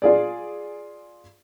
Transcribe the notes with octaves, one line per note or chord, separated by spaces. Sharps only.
F4 G#4 D5